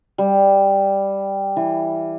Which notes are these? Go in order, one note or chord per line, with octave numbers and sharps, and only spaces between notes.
G3
E3